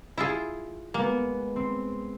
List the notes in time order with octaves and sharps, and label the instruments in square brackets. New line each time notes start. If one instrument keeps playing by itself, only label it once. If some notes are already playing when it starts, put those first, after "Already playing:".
[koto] E4 F4 G#4
[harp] G#3 B3 [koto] A#3
[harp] C4